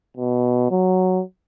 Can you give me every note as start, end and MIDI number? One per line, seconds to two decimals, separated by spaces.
0.17 0.69 47
0.71 1.22 54